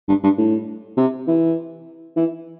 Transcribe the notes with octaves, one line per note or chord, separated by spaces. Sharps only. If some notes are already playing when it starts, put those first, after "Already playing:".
G2
G2
A2
C3
E3
E3